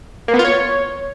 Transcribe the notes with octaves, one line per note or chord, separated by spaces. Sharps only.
A#3
B3
F4
C#5